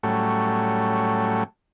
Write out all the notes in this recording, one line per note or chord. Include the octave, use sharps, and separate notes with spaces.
A2 F#3 G3 A3 C#4